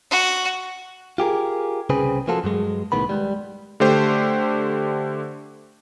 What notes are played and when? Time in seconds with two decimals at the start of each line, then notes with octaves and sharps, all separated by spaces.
0.11 F#4
1.18 F4 G4 G#4 A#4
1.90 C2 C#3 C4 G#4 B4
2.28 F3 A#3 F4 F#4 A4
2.44 G2 F#3 G#3
2.92 C2 A2 D#3 B3 B5
3.09 G3 G#3
3.80 D3 A3 G4 C5